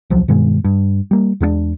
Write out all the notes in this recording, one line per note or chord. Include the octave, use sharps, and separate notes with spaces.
D#1 C2 F3 F#3
G2 B2 D#3 G#3
G2
G3 A#3
E2 G#3 A#3 D4